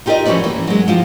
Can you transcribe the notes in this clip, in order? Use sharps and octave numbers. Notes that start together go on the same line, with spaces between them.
D#4 F4 G4 A#4 D5 D#5
E3 F3 C#4 F#4 B4 D5
E3 A#3
F#3 G#3
F3 F4 G4